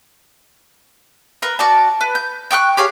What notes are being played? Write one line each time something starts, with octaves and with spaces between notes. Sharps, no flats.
A#4 B4
F#4 D5 A5
B4
G6
G5 C#6 D6 F#6
G4 G#4 C#5 F5